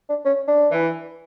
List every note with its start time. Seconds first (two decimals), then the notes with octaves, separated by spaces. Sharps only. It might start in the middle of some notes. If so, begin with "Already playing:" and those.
0.09 D4
0.25 C#4
0.48 D4
0.71 E3